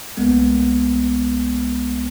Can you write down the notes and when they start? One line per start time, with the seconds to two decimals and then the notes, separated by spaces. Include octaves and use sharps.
0.17 C2 G#3 A#3 B3